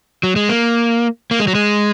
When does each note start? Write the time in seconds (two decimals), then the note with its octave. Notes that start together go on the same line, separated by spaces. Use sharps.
0.23 F#3
0.36 G#3
0.49 A#3
1.31 A#3
1.40 G#3
1.47 F#3
1.55 G#3